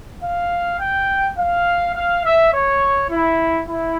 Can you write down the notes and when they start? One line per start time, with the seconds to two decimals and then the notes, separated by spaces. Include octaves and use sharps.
0.22 F5
0.79 G5
1.37 F5
1.94 F5
2.23 E5
2.52 C#5
3.10 E4
3.68 E4